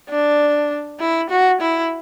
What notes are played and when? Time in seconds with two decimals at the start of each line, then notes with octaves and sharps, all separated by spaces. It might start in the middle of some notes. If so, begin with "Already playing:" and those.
0.10 D4
1.00 E4
1.30 F#4
1.61 E4